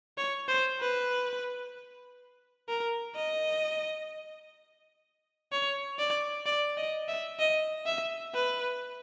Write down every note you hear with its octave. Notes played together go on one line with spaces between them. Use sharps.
C#5
C5
B4
A#4
D#5
C#5
D5
D5
D#5
E5
D#5
E5
B4